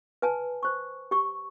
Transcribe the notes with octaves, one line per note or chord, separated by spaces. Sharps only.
B4 G#5 A5
C5 C#6
G4 C#6